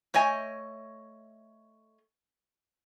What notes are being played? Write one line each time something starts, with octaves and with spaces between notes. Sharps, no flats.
A3 C#5 D#5 G#5